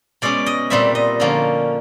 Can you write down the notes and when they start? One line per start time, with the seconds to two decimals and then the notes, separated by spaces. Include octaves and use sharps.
0.22 B2 G#3 C#4 D5
0.46 D#5
0.70 A#2 G3 C4 E5
0.95 D#5
1.20 D3 F3 A#3 C#4